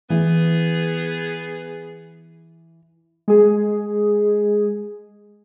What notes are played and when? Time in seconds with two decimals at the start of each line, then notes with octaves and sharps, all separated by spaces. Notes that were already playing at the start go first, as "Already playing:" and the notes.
0.10 E3 B3 G#4
3.28 G#3 G#4